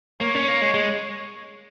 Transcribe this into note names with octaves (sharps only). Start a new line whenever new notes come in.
A#3 C#5
C#4
A#3
G#3
G#3